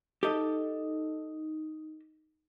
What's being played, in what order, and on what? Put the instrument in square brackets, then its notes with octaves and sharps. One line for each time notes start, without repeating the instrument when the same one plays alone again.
[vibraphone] D#4 [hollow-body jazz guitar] G4 A4 D#5